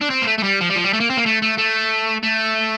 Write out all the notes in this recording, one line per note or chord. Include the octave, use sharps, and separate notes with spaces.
D4
C4
A#3
A3
A3
G3
F3
G3
F3
G3
A3
A#3
C4
A#3
A3
A3
A3
A3